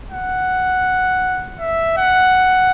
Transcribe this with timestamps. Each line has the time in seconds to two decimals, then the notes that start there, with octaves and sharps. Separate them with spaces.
0.11 F#5
1.59 E5
1.98 F#5